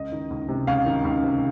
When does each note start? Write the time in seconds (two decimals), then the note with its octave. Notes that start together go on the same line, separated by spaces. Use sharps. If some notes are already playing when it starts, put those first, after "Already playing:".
Already playing: C#2 D#5
0.12 D#3
0.30 C#2
0.49 C3
0.67 C#2 F5
0.86 D#3
1.05 C#2
1.23 C3